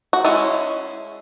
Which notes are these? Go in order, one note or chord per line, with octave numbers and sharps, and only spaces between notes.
F#4
G#3 C#4 E4